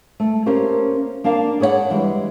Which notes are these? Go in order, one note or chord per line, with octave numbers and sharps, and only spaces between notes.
A3
A#3 C#4 G4 A#4 C5
A#3 D4 A#4 F5
G#4 B4 C#5 D#5 F#5
E3 G3 G#3